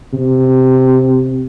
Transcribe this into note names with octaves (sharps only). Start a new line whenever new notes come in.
C3